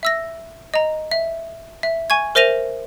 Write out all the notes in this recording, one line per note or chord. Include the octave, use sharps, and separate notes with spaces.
E5 E6 A#6
D#5 A#5
E5
E5
G#5 C#6 G#6
A#4 C5 E5 A#6 D#7 F7